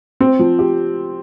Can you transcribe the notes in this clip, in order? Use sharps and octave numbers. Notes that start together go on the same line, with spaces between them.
C4
F3
G4